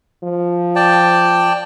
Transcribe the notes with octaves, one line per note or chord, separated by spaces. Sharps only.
F3
D5 G5 A5